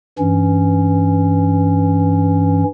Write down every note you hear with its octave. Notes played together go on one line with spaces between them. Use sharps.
G2 E3 C#4